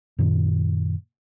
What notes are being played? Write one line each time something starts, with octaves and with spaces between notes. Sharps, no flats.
F#2 A#2 D#3